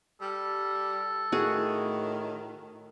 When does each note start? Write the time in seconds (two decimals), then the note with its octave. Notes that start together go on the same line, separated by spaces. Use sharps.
0.21 G3 A4
1.32 A2 D#3 F#4 G#4